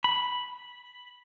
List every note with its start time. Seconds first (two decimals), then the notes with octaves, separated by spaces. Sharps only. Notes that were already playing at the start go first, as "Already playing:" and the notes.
0.04 B5